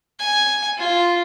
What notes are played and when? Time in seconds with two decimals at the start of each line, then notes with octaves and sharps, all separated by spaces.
0.20 G#5
0.78 F4